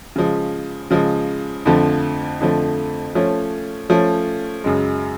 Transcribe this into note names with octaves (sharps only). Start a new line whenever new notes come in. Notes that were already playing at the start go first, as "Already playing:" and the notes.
C#3 F3 G#3
C#3 F3 G#3
F2 D3 F3 A3
F2 D3 F3 A3
F3 A3 C#4
F3 A3 C#4
F#2 C#3 G#3